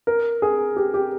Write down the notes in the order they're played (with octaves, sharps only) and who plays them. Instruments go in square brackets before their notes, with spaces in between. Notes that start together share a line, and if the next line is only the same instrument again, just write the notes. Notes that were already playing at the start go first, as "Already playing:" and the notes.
[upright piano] A#4
G#4
G4
G4